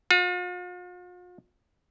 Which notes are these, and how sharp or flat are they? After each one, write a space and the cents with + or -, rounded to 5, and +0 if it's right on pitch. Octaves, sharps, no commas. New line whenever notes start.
F4 +45